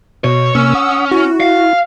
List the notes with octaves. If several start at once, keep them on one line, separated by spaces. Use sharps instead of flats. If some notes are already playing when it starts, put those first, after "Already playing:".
B2 C#5
C3 A#3 C#4 E6
F#5 D#6
E4 F#4
F5